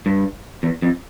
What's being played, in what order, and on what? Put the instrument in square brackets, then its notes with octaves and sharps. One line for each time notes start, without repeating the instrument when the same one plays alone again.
[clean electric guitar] G2
E2
F2